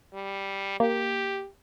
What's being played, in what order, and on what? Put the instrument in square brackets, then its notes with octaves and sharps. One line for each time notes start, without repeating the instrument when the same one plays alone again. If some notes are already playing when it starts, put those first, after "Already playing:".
[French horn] G3
[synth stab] A#3 [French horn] G4